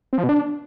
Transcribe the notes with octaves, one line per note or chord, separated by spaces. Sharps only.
C4
F3
B2
D4